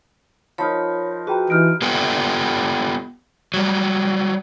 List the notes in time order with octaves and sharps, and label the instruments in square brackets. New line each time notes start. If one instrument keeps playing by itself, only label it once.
[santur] F3 D#4 A#4 [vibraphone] C#5 B5
[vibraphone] F#4 [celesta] G#4 G5 A#5 [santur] B4
[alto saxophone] E3 [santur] D#4 G4 [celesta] F6 D7
[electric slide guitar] B3 F4 G4 A4 B4
F#3 G3